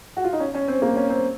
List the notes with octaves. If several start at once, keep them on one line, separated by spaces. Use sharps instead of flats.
F#4
F4
D#4
C#4
C#4
C4
A#3
C#4
C4